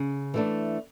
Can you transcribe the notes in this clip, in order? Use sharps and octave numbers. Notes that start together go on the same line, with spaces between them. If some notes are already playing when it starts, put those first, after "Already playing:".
Already playing: C#3
E3 A3 D4